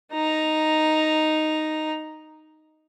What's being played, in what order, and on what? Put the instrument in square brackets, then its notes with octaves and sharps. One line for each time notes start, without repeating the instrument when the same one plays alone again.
[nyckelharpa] D#4 A#5